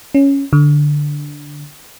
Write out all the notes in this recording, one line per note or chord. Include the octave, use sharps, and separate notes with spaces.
C#4
D3